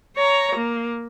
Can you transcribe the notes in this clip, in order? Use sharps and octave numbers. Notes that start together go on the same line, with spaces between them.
C#5 A#5
A#3